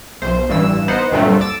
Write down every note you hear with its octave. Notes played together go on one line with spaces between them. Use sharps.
B1 C5
A1 G2 E3 E6
B3 D#4 C5 F#5
D2 G2 A#2 F#3 A3 C4
D6 E6 A6